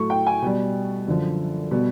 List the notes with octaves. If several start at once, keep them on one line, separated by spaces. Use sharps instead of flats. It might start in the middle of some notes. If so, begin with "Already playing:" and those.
Already playing: A2 F#3 A3 C#6
G5
G#5
B2 G3
F#2 D3 F3
B2 G3